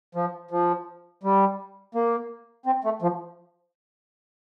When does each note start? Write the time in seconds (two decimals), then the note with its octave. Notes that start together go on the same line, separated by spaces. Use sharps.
0.15 F3
0.51 F3
1.23 G3
1.95 A#3
2.66 C4
2.84 A3
3.02 F3